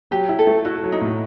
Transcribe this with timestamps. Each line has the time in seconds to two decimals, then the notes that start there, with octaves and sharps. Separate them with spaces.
0.11 F#3 G4
0.29 E4
0.39 A4
0.47 A3
0.65 E4 F#4
0.84 F#3
0.92 D#4
1.01 A2